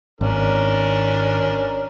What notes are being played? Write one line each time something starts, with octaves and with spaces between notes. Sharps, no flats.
G#1 C#4 D4 A#4